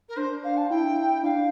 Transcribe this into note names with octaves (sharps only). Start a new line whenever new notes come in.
A#4
D4 C5
F5
A5
E4 G5
D4 F5